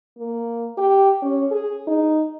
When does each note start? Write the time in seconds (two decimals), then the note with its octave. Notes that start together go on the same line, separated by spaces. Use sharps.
0.18 A#3
0.78 G4
1.22 C#4
1.52 G#4
1.87 D#4